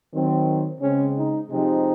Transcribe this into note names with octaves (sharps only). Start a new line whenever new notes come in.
D#3 F#3 C4
C#3 G#3 C4 C#4
D#4
C3 F3 G#3 C4 D#4